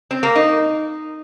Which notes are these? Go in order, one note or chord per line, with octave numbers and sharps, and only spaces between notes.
C4
A#3
D#4